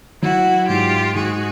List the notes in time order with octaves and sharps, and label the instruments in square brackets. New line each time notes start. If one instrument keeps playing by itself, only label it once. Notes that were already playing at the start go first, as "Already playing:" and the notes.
[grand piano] F#3 [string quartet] E4 F#4
[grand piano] G#2 [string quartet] F4 G4
[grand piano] G#2 [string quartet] F#4 G#4